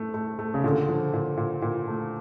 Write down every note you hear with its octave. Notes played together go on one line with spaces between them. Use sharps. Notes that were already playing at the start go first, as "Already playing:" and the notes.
Already playing: A3
A3
A3
C#3
A#2 D3
F3
A#2
A#2
A#2
A3